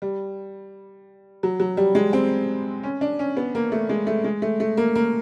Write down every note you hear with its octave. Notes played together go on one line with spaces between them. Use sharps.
G3
F#3
F#3
G3
G#3
C4
C#4
D4
C#4
B3
A#3
A3
G#3
A3
G#3
A3
A3
A#3
A#3